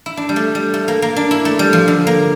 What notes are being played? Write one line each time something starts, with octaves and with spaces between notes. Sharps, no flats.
E4
D4
G3
A3
G3
A3
A#3
A#3
D4
E4
A3
G3
F3
D3
A#3